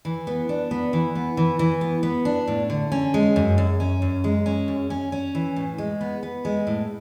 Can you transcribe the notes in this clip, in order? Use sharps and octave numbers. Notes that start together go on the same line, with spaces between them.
E3
B3
D4
B3
E3
B3
E3
E3
B3
B3
D4
A2
D3
C#4
G#3
F#2
F#2
C#4
F#2
G#3
C#4
F#2
C#4
C#4
E3
A2
G#3
B3
B3
G#3
A2